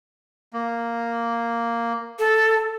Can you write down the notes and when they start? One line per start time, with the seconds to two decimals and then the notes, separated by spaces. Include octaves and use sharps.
0.53 A#3
2.19 A4